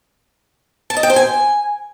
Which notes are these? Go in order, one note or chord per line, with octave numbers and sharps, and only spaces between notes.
A5
D#5
G5
C5
G#5